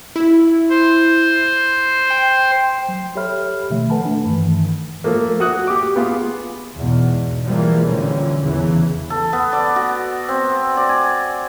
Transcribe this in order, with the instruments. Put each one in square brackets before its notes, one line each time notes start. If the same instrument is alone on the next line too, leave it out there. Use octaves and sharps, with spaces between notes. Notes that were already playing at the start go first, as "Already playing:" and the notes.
[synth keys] E4
[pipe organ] C5
[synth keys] G5
[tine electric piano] F#3
G4 A4 C#5 E5 B5 F6
B2 D#3 F3 A3 E5
A4 B4 F#5 G#5 A5 B5
A3 D4
G2 D#3 E3
[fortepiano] F3 A3 A#3
F#4 D#6 F#6
G4 D6
B3 F4 G#4
[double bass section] E2 G#2 B2
E3 F3 G3 G#3 A#3
A#1 A#2 D3 E3 G3 C#4
E2 C#3 E3
[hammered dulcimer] A4
B3
D5
F#4
C4
D5
G#5